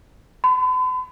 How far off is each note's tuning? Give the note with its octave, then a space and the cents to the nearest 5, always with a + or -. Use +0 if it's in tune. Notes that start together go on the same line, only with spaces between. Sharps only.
B5 +45